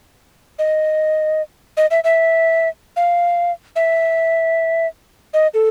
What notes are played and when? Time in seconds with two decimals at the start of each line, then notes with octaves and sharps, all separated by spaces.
0.59 D#5
1.77 D#5
1.91 E5
2.04 E5
2.96 F5
3.76 E5
5.34 D#5
5.54 A4